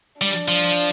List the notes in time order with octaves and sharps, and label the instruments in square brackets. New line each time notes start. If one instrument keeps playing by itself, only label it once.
[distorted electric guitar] G3 [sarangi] D4
[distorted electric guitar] F3